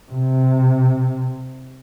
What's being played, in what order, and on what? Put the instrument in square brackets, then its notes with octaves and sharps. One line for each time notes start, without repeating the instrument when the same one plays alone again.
[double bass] C3